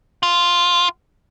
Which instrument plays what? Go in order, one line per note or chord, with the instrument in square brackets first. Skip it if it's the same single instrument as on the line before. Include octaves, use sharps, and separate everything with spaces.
[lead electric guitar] F4